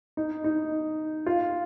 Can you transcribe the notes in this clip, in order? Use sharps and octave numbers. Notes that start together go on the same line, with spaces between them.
D#4
D#4
F4